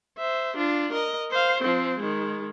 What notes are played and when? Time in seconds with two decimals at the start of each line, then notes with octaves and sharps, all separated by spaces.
0.18 C5 E5
0.56 D4 F4
0.93 A#4 D#5
1.31 C5 F5
1.62 F3 C4
1.99 D#3 G#3